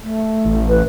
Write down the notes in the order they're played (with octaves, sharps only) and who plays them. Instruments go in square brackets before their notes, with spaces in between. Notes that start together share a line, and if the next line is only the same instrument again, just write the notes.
[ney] A3
[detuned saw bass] A1
[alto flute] B4